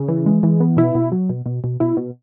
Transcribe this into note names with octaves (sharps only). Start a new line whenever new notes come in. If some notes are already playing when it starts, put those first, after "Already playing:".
Already playing: C#3
E3
G#3
E3
B3
B2 E4
B2
F#3
B2
B2
B2
B2 E4
B2